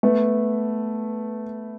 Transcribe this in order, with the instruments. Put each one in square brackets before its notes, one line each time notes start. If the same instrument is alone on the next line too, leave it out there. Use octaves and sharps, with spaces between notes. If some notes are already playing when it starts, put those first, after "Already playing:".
[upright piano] A3 B3